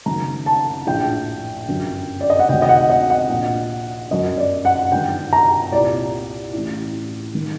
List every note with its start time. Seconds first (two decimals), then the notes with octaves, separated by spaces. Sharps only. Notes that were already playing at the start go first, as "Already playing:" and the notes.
0.06 F#1 F#2 D#3 A#5
0.46 A5
0.87 A#1 A2 G5
1.68 G1 F#2 D3
2.21 D5
2.30 D#5
2.39 F#5
2.49 D2 C3 D#3 G5
2.62 D#5
2.69 F#5
2.90 D#5
3.10 F#5
3.29 A#1 A#2
4.11 G1 F#2 D3 D#5
4.38 D5
4.65 F#5
4.92 G1 G2 D#3 G5
5.33 A#5
5.72 C2 A#2 D5
6.54 A1 A2
7.35 D#3